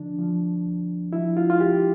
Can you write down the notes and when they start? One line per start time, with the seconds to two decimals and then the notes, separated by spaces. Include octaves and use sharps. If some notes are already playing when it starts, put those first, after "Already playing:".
Already playing: D3 F3 D4
0.19 F3
0.66 D2
1.13 F3 E4
1.37 F4
1.50 F4
1.60 D2 G4